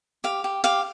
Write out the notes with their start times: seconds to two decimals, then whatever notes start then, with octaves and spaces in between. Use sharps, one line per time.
0.24 G4 F5
0.44 G4
0.64 G4 F5